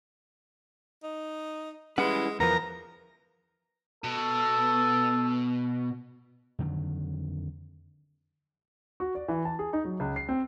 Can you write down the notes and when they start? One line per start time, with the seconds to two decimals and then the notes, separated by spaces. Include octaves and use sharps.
1.04 D#4
1.98 G3 G#3 C#4 E4 B4 F#5
2.40 E2 E3 F3 B3 A#4 A#5
4.04 B2 A4
6.59 F2 D3 D#3 F#3
9.00 F#4
9.15 D5
9.28 E3
9.45 A5
9.59 G#4
9.73 D#4
9.85 F#3
10.00 C#2
10.16 C7
10.29 C4